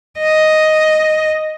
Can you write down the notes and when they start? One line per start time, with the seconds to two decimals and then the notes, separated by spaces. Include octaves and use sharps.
0.20 D#5